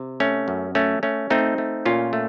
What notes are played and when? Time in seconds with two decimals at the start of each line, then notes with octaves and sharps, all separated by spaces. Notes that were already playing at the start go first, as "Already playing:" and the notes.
Already playing: C3
0.20 A3 C#4
0.48 F#2
0.75 A3 C#4
1.03 A3 C#4
1.30 A3 C4 D#4
1.58 A3
1.85 A#2 C#4 F4
2.13 A3